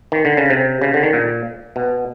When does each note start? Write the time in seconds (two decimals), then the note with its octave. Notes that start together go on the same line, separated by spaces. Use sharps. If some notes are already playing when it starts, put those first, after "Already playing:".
0.12 D#3
0.25 D3
0.37 C#3
0.50 C3
0.82 C#3
0.94 D3
1.03 D#3
1.13 A#2
1.76 B2